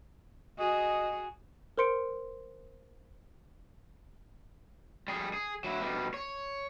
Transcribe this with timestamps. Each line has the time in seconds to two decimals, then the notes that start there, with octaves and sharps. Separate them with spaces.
0.58 F#4 G#4 D#5
1.78 A#4 C5 C6 C#7 D7
5.08 G3 G#4
5.34 G#4
5.64 F#3 E4
5.80 B2 G3
6.14 C#5